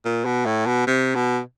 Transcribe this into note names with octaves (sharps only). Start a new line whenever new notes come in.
A#2
B2
A2
B2
C3
B2